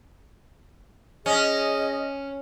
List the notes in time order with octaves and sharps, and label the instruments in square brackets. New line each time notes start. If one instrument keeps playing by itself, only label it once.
[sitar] C#4 [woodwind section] G#4 D#5